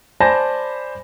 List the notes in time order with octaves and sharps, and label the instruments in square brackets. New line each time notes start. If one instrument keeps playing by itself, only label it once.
[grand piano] C5 D5 G#5 A5 B5 A#6